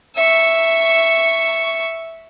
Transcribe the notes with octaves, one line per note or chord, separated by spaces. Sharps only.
E5 C#6